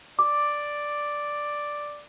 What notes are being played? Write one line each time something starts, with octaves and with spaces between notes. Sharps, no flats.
D5 D6